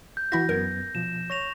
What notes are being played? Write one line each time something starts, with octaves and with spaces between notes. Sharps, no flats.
G6
E3 E4 F#4 E5 A#6
F#2 B3 A#4 G#6
B2 F3 E7
C#5 C#6 A#6 F7